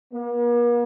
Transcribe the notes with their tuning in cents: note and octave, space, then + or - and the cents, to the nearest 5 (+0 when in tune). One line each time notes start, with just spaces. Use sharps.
A#3 +45